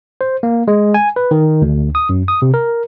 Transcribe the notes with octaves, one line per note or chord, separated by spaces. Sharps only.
C5
A#3
G#3
G#5
B4
D#3
D2
D#6
F#2
D#6
C3
A#4